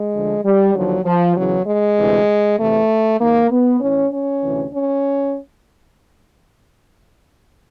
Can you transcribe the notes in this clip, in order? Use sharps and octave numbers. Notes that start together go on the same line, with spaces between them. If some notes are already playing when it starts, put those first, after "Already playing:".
Already playing: G#3
D2 D3 F3
G3
D#2 D3 F3 F#3
F3
E2 C#3 E3 F#3
G#3
D2 C3 E3
E2 C3 E3 A3
G#2 D#3 A#3
B3
A2 E3 C#4
C#4
D2 C3 E3
C#4